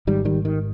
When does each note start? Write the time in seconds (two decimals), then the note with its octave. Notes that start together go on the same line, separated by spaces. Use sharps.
0.07 G#1 G#2 D#3 G3
0.25 D#3 G3
0.45 D#3